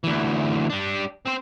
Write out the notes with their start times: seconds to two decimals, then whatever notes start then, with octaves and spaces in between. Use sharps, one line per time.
0.04 D2 E3
0.70 G3 D4
1.26 C4 C5